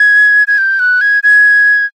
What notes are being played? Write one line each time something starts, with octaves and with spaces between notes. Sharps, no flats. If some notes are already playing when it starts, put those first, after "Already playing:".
Already playing: G#6
G#6
G6
F#6
G#6
G#6